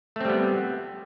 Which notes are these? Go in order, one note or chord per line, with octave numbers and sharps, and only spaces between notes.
G3 A3 B3 C4